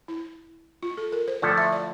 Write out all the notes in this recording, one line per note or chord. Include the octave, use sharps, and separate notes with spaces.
E4
F4
A4
A#4
C5
D3 F3 A3 E4 A4 D5
E5
D5